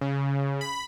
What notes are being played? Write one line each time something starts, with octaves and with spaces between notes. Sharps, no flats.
C#3
B5